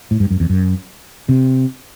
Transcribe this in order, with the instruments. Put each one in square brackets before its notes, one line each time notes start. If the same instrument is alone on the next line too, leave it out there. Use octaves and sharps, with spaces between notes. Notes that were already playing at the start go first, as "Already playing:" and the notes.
[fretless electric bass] A2
G2
F#2
E2
F#2
C3